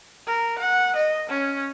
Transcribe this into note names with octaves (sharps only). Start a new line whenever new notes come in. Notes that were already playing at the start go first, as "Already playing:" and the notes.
A#4
F#5
D#5
C#4